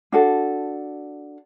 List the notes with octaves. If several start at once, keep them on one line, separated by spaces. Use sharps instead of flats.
D4 F#4 A4